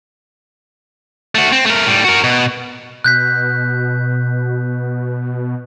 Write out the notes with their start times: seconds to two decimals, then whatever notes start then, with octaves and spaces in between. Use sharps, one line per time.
1.35 A3 F#4
1.52 C4
1.66 A3 A#4
1.86 A2 G3
2.05 F#4 A#4
2.24 B2
3.04 B2 F#6 G6 B6